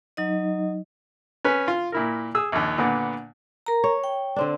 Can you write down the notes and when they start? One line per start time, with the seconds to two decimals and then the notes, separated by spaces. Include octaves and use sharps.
0.17 F#3 D#4 D#5
1.44 C#4 B4
1.68 F4
1.92 A#2 E4 A#4
2.35 G#4 E6
2.52 A#1 D#2
2.78 A#2 D3 B3
3.66 A#4 A#5
3.84 C#5
4.04 G5
4.36 D3 C4 D4